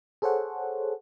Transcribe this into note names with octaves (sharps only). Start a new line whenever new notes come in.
G#4 A4 C5 C#5 F#5